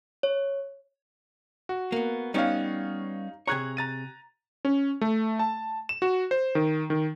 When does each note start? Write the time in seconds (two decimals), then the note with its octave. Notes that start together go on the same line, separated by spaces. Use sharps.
0.23 C#5
1.69 F#4
1.92 A#3 B3
2.34 G3 B3 C#4 D#4 C#5 F5
3.47 C3 G#4 C#5 A#5 F#6 G#6
3.77 A#5 A6 D#7
4.65 C#4
5.01 A3
5.39 A5
5.89 E7
6.02 F#4
6.31 C5
6.55 D#3
6.90 D#3